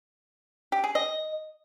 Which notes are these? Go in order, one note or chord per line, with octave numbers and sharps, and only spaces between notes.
G4
G#4
D#5